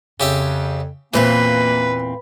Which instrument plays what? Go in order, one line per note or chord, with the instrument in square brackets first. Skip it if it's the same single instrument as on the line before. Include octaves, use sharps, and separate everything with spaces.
[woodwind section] F2 [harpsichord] C#3 G4 E5
[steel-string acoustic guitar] E2 A#2 C4 [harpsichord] E3 [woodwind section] A#3 [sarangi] B4